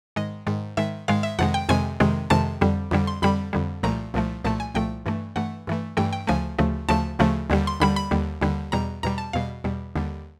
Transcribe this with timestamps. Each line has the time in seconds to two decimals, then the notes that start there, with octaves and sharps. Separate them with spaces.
0.16 G#2 D#3 G#3 D#5
0.47 G#2 D#3 G#3
0.77 G#2 D#3 G#3 E5
1.08 G#2 D#3 G#3 F5
1.23 E5
1.39 F2 C3 D#3 G#3 F#5
1.54 G5
1.69 F2 C3 D#3 G#3 G#5
2.00 F2 C3 D#3 G#3
2.30 F2 C3 D#3 G#3 A5
2.61 F2 D3 G3
2.91 F2 D3 G3
3.07 C6
3.22 F2 D3 G3 B5
3.53 F2 D3 G3
3.83 C2 A#2 F3 A3 A#5
4.14 C2 A#2 F3 A3
4.44 C2 A#2 F3 A3 A5
4.60 G#5
4.75 C2 A#2 F3 A3 G5
5.06 G2 E3 A3
5.36 G2 E3 A3 F#5
5.67 G2 E3 A3
5.97 G2 E3 A3 G5
6.13 G5
6.27 D2 C#3 F3 A3 G#5
6.59 D2 C#3 F3 A3
6.89 D2 C#3 F3 A3 A5
7.19 D2 C#3 F3 A3
7.50 D#2 D3 G3
7.67 C6
7.80 D#2 D3 G3 B5
7.96 B5
8.11 D#2 D3 G3
8.41 D#2 D3 G3
8.72 E2 B2 G3 A#5
9.03 E2 B2 G3 A#5
9.18 A5
9.33 E2 B2 G3 F5
9.64 E2 B2 G3
9.96 D#2 D3 G3